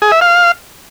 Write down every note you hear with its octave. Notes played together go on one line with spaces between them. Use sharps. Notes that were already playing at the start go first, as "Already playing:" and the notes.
G#4
E5
F5